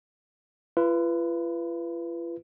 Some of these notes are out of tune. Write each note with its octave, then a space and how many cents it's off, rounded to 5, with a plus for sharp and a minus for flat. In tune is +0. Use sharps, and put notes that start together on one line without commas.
F4 -45 B4 +0